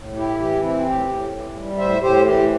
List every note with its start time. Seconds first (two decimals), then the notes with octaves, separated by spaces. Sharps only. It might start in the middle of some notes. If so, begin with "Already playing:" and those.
Already playing: A2
0.16 E4 G4
0.39 E3 G4
0.62 C4 E4
0.86 A2 G4
1.09 A2
1.32 E3
1.55 G3
1.78 A2 C5 E5
2.01 A2 G4 C5
2.25 E3 G4